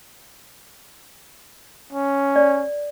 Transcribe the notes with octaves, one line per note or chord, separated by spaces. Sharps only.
C#4
D5